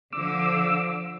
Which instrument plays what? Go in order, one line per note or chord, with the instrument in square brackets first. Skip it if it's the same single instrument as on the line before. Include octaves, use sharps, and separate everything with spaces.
[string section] D3 F3 [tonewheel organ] D6 E6